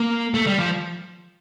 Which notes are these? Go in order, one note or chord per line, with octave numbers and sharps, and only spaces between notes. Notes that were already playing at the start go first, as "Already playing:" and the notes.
Already playing: A#3
A3
G3
F3